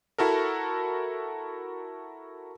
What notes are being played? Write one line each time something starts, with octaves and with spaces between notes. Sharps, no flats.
E4 F#4 A4 A#4